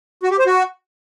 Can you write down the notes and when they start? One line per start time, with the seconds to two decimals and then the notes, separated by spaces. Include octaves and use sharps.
0.23 F#4
0.31 G4
0.39 C5
0.46 F#4